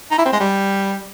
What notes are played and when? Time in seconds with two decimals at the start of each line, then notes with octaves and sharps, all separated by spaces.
0.11 D#4
0.18 E4
0.26 C4
0.33 G#3
0.40 G3